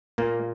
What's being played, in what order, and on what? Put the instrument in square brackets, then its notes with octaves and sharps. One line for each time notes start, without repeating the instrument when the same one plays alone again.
[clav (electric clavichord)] A#2 A#3